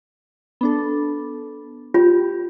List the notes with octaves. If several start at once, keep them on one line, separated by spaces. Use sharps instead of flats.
B3 D4 A4
F4 G4